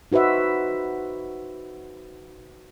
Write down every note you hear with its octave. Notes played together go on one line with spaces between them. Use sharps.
D#4 F#4 B4 C5 E5